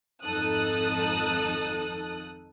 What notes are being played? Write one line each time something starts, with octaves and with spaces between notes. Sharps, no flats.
G#1 F2 D#4 A4 D#6 F#6